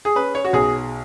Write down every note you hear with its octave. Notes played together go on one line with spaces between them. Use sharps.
G#4
C#4 B4
C#5
F#4
B1 G#4